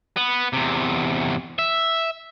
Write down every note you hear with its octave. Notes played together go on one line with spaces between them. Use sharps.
B3
E2 C3
E5